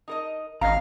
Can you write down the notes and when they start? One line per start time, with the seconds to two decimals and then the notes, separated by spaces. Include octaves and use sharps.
0.08 D#4 A#4 D#5
0.61 G#1 C#4 D#5 F5 A#5